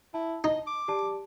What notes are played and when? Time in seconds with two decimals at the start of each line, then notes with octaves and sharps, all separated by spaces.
0.14 E4 A5
0.44 D#4 D#5
0.67 D6
0.88 G4 D5 A5